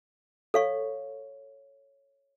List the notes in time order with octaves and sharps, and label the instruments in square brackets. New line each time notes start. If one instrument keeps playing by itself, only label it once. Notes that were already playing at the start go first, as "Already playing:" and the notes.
[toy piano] A4 F5 C#6 [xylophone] C#5